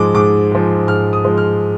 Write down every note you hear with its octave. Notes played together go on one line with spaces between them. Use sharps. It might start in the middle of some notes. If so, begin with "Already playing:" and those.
Already playing: G#2 F3 G#3 D6
G#2 D6
F3 G#3
G#2 F6
D#6
F3 G#3
F6